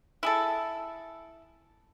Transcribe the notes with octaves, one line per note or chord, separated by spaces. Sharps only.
E4 G#4 A4